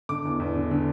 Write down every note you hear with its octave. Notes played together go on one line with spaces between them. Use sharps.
D3 D6
E2
E2
D3
D3